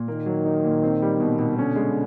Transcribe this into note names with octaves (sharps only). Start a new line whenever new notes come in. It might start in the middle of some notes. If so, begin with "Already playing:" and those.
Already playing: A#2
D#3 A#3
F#3
D#4
A#2
C4
G3
B2
B2
D3 C#4
G#3